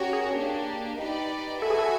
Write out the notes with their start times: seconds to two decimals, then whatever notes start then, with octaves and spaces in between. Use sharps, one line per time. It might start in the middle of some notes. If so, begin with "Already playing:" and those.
Already playing: C#4 F#4 G4 A#4 C#5
0.13 G#4
0.35 A#3 D4 G4
0.98 D#4 G4 B4 D5
1.62 F#4 A4 B4 E5 G#5
1.70 G#4
1.79 A4